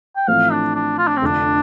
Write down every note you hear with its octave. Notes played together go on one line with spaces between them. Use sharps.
G5
A1 A2 F3 C4 F5
D4
D4
F4
D4
C4
F1 F2 D3 F3 D4